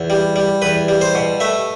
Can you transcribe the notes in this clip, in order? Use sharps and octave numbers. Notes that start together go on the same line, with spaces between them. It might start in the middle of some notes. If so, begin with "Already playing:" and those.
Already playing: E2
G3
G3
E2 B4
G3
C5
B2
A3 E5